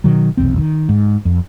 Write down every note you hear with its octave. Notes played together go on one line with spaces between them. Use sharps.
B2 D#3 F#3
F1 B1 E2 C4
D#3
G#2
F2